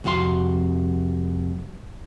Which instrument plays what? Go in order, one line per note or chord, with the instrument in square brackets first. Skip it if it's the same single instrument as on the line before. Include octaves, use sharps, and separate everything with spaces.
[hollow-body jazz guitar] C2 F2 F#4 F5 C6